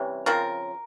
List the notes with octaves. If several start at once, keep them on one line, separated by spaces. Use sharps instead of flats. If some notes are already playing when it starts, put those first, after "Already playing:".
Already playing: C3 E3 G3 C#4
C#3 F3 C4 A#4